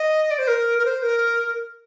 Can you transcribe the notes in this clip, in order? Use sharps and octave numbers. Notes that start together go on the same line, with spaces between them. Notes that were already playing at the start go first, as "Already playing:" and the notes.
Already playing: D#5
D5
C5
A#4
A#4
C5
A#4